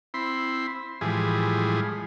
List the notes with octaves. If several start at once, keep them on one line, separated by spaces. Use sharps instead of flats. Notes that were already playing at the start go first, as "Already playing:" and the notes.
C4 E4 B5 C6
A2 E3 F3 G3 G#3 G#4